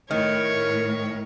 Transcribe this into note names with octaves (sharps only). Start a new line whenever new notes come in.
A2 D#3 A#4 C#5